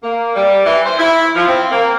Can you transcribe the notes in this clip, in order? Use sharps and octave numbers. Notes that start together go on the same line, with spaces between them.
A#3
G3
E3
C5
E4
F3
C4
A#3